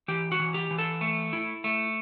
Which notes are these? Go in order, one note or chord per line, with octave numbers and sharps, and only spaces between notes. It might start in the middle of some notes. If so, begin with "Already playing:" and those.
E3 G4
F#4
E3
G4
E3
A4
A3
E4
A3